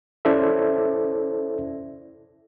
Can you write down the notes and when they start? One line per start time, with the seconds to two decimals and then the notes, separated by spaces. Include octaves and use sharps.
0.25 C#4 E4 A4 C5 D5 E5